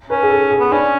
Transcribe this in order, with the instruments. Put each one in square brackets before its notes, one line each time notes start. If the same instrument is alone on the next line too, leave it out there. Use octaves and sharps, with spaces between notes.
[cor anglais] C#4 [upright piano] B4
[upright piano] G#4
A4
G#4
[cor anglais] B3
[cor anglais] C#4 [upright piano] D4